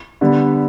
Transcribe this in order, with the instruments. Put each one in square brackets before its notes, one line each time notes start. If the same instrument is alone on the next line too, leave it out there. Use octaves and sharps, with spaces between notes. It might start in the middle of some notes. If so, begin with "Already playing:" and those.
[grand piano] D3 G3 B3